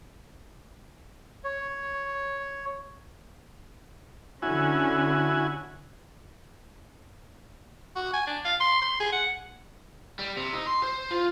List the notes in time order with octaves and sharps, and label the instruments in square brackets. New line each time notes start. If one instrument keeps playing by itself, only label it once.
[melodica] C#5
[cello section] D3 C#4 [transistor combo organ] E4 F#4 G#5
[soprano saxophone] F#4
G#5
D4
F5
C6
C6
G#4
F#5
[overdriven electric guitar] G3
C3
D#4
C6
C5
F4